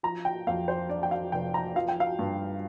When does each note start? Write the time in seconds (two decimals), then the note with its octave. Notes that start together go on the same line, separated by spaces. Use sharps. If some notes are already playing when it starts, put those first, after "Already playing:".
0.03 F3 A#5
0.25 G5
0.47 F2 F5
0.68 C5
0.89 D4 D5
1.03 G5
1.11 F5
1.32 F1 G5
1.54 A#5
1.76 F3 F5
1.88 G5
2.00 F5
2.19 G2